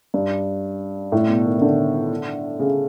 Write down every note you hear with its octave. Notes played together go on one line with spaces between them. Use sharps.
G2
A2
B2
D#3
D#3
D3
C#3